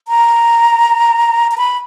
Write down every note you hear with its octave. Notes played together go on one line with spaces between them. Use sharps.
A#5
A#5
B5